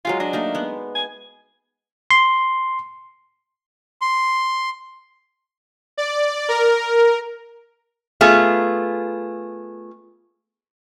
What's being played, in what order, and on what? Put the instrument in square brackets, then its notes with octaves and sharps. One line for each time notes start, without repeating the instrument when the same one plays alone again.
[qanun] F#3 G#3 G#5 [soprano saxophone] F4
[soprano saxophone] D4 [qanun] D#5
[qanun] A3 A#3 D#4
G#3 B3
[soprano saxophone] G#5
[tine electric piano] C6
[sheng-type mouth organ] C6
[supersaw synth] D5
A#4
[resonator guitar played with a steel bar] A3 B3 F4 G#4